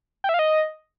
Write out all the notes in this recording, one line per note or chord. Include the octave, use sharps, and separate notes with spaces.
G5
E5
F5
D#5